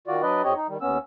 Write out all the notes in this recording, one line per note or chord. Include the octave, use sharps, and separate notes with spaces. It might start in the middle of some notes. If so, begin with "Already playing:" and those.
D#3 F4 F#4 D5
F#3 D4 B4 D5 D#5
F2 C4 G4 C#5 D#5
D#4
D#3 G3
D#2 B3 C#4 E6